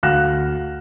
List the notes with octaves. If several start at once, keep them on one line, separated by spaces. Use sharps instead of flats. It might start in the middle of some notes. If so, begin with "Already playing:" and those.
D2 F5 F#5 F#6 A#6 E7